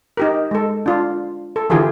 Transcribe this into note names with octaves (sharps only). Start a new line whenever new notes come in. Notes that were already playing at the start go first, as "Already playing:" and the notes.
D#4 G4 A#4
G#3 A4
D4 F4
A4
D3 E3 F4 G4 G#4